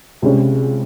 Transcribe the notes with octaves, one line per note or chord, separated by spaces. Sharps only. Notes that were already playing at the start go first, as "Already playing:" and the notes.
C#2 C3 G3 C#4